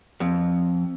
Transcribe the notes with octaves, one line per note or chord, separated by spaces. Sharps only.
F2